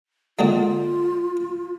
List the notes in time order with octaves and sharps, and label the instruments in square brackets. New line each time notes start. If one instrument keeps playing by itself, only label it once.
[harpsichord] A#2 D3 G#3 [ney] F4